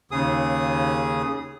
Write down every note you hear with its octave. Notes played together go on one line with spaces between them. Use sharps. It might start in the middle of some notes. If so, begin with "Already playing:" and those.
D#2 C#3 G#4 D#6